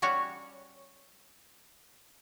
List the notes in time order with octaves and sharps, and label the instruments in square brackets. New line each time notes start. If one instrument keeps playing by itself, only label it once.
[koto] G3 C#4 F#4 C#5